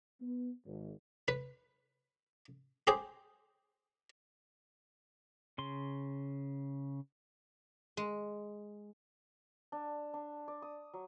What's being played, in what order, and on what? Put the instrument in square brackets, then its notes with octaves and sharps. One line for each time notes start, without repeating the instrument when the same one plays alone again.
[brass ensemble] B3
G#1
[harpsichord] B4
G4 G#4 C5
[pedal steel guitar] C#3 C6
[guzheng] G#3
[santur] D4
D4
D5
D#6
F#3